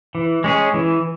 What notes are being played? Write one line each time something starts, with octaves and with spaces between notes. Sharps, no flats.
E3
G#3 C#4 G#4
E3